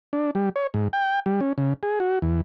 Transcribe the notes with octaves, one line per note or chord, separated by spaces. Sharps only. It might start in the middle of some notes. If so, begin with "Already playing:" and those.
D4
G3
C#5
G#2
G5
G3
C#4
C#3
G#4
F#4
E2